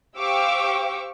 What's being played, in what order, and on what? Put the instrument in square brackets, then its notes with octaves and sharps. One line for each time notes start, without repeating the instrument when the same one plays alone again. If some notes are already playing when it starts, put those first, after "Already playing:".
[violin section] G4 C5 F5 C#6 D6 E6